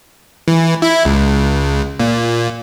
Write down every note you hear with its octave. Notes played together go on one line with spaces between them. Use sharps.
E3
E4
C#2
A#2